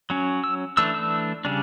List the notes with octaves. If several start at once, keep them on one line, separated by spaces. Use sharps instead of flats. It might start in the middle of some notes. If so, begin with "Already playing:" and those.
F#3 C#4
E6
E3 A3 D4 E6
E6
C#3 G3 D4